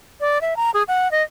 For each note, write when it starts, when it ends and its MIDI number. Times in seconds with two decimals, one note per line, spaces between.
0.21 0.41 74
0.41 0.57 76
0.57 0.71 82
0.74 0.83 68
0.88 1.10 78
1.11 1.23 75